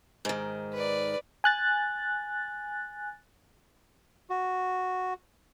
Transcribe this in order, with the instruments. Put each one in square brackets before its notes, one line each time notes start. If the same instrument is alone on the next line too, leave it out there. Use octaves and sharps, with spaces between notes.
[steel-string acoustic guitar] G#2 D#3
[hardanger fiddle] B4 D5
[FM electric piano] G#5 F#6 A6
[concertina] F#4